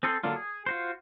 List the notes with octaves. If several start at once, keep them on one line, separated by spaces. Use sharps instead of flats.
C4 G#4 A4 C5
D3 F#3 A#3 D4 F4
G#4
F4 F#4 C5